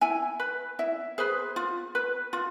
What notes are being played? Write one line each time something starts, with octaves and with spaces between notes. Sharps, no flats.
E4 G#5
B4
E4 E5
G#4 B4 C5
F4
B4
F4